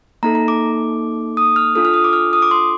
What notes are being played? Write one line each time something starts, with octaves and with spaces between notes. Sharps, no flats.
A#3 D#4 A4 A#5
A#5
D6
D#6
F6
D4 F4 A4 D#6
F6
D#6
D6
F6
D#6
D6
C6